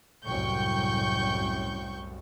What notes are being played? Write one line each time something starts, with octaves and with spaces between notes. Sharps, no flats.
C2 F#2 A2 G5 C#6 G6